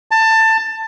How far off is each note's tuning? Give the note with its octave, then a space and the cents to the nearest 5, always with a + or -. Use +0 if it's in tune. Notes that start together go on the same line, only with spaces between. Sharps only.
A5 +20